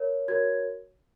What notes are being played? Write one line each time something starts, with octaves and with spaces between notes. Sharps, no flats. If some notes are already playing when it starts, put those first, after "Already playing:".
Already playing: A#4 C#5
F#4 A#4 C#5 G#6